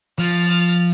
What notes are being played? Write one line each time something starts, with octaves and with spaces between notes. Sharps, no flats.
F3 F6 A6